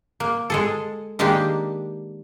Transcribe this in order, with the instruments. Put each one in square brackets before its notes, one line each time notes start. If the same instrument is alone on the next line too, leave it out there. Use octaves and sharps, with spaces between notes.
[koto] A#3
G#3 G#4 A4
D#3 G#3 A#3 D4 G4